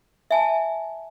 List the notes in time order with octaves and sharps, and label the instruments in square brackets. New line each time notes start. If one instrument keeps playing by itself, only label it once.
[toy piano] E5 G#5 A5